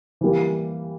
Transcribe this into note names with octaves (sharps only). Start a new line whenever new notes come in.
E3 G3 A#3